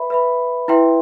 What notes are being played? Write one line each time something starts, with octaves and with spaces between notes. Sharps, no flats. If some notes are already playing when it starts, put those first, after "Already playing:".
Already playing: B4 E5 B5
B4 E5 B5
E4 B4 E5 G5 C6